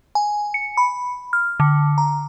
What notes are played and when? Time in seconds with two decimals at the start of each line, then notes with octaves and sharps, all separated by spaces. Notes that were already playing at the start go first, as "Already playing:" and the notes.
0.15 G#5
0.54 C#7
0.77 B5
1.33 F6
1.60 D3
1.98 A#5